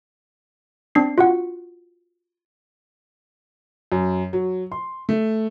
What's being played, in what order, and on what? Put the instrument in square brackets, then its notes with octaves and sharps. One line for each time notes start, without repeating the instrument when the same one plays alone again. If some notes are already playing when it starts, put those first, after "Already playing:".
[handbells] C4 D4 C7
F4 F#4 F#5
[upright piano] F#2
F#3
C6
A3